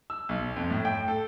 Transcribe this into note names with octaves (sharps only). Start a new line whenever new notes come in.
E6
B1
F2
A2
G5
A4